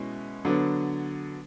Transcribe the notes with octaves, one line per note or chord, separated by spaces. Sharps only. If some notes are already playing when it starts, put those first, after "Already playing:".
Already playing: B2 G#3 C#4 E4
D3 F#3 B3 D4